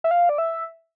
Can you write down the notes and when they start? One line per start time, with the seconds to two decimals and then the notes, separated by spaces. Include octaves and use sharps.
0.04 E5
0.11 F5
0.29 D5
0.38 E5